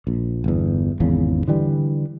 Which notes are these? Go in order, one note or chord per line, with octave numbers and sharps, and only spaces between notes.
A#1
G1 E2
G#1 E2 C#3
D3 E3 G3